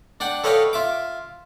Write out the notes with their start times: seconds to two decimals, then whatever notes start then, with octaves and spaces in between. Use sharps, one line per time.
0.20 D4 D5 F#5 G5
0.44 A4 B4 C#5 D#5 F5 G5
0.73 F4 E5 D6